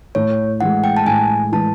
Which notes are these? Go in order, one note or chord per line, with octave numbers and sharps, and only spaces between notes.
A2 C#5
E3 G#3 F#5
G5
A5
A2 G#5
E3 G#3 A5